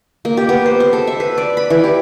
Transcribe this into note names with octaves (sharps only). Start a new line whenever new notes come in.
A#3
G4
B3
C5
C5
A4
E5
B4
D5
B5
E3
G4